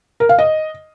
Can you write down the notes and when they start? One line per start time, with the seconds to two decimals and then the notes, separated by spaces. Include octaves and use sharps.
0.20 A#4
0.29 F5
0.39 D#5